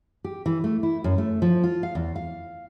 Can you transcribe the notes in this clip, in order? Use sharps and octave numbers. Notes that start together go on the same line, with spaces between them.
G4
E3
A3
E4
F#2
A3
F3
F4
F5
E2
F5